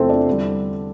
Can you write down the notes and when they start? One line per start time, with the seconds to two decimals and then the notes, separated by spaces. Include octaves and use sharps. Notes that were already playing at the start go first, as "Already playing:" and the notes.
Already playing: E2 C3 F3 A3 C4 A4 C5
0.09 D4 D5
0.28 E2 D3 G3